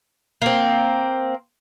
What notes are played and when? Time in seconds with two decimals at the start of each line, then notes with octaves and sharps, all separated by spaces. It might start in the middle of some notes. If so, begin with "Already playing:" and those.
0.42 A#3 C4